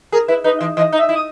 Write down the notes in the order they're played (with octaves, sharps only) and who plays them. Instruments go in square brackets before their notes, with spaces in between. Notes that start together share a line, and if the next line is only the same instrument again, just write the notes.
[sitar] G#4 [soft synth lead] A#4
[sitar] E4 [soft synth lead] B4
[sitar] D#4 [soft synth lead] B4
[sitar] E3
[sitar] E3 [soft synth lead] D#5
[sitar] D#4
[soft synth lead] E5
[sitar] E4
[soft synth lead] D#6